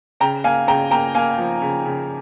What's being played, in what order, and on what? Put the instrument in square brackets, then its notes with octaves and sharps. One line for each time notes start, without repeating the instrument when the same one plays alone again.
[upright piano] C#3 G5 A#5
A#3 F5 G#5
C#3 G5 A#5
A#3 G5 A#5
A#3 F5 G#5
F3
C#3
C#3